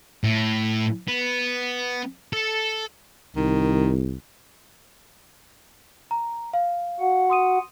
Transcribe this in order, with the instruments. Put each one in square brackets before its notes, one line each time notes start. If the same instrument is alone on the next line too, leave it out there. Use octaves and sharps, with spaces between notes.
[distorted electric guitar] A2
B3
A4
[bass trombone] C2 [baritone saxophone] D#3
[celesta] A#5
F5
[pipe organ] F#4 F#5
[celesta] C6 D#6 D#7